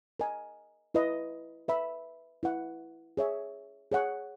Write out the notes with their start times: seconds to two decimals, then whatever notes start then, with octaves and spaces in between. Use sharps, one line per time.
0.20 A#4 D#5 G#5
0.94 E4 B4 D#5
1.68 B4 E5 B5
2.43 E4 B4 F#5
3.17 G#4 C#5 E5
3.92 G#4 C#5 F#5